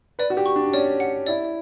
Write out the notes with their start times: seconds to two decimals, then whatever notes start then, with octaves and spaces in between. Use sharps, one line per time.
0.19 B4 D5
0.30 F#4
0.37 G4
0.46 C#6
0.56 D4
0.73 C#4 D5
1.00 F#5
1.27 E4 D5